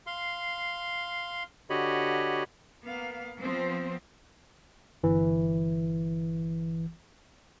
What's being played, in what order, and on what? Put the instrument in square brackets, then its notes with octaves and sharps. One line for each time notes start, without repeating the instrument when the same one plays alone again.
[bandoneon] F5 C6
D3 F#4 G4 C#5 D#5 B5
[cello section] A#3 B3 F5
F3 B3 C4 C5
[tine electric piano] G1 E3